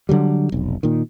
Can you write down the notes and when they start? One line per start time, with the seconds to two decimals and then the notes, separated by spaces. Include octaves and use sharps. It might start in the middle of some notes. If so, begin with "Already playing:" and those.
0.09 D3 F#3 G3
0.52 F1 B1
0.83 A#2 D#3